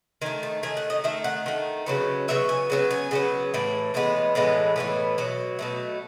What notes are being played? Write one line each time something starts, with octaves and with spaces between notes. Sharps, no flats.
D#3 A3 G#5
A5
D#3 A3 G#5
F#5
D#5
D#3 A3 E5
F#5
D#3 A3
C#3 F#3 B3
C#3 F#3 B3 E5
G#5
C#3 F#3 B3
G#5
C#3 F#3 B3
A2 E3
A2 E3 G#3 B3
A2 E3 G#3 B3
A2 E3 G#3 B3
B2 F#3
B2 F#3 A3